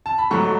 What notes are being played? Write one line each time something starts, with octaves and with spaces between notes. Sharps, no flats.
A5
B5
G#2 F#3 A3 C#6